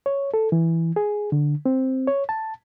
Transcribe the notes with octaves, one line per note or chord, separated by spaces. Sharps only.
C#5
A4
E3
G#4
D3
C4
C#5
A5